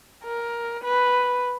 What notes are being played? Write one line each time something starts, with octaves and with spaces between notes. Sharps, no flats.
A#4
B4